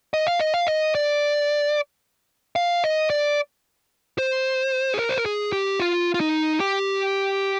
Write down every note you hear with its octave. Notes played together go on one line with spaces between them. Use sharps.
D#5
F5
D#5
F5
D#5
D5
F5
D#5
D5
C5
G#4
A#4
C5
A#4
G#4
G4
F4
F4
D#4
G4